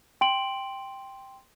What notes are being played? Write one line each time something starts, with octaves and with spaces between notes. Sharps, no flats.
G5 C6 D7 F#7